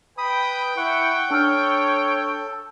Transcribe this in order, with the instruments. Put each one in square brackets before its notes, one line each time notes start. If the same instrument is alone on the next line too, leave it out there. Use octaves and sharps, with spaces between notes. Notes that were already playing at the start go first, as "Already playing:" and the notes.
[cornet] B4 [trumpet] G5 [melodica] B5 D#6
[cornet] E4 [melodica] F#5 C#6
[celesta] D4 E6 F6 [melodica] A4 [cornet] C#5